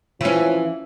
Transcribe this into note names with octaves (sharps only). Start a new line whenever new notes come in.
E3 F3 C#4